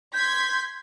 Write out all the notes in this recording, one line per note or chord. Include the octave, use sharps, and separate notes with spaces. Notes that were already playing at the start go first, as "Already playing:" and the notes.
C6 G6 G#6 B6